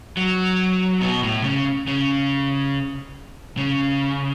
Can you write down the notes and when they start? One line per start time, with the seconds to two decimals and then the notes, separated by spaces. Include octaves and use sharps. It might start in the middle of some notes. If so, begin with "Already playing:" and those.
0.17 F#3
1.01 B2
1.23 A2
1.44 C#3
1.87 C#3
3.57 C#3